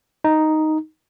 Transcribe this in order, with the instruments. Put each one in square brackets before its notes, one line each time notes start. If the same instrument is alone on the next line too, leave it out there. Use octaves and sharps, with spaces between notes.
[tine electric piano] D#4